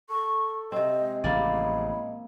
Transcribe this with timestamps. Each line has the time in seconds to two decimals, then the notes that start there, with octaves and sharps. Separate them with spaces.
0.10 A4 C#6
0.72 C3 C4 D#5
1.02 G#3
1.24 A1 C#3 F3 A#3 D5 B5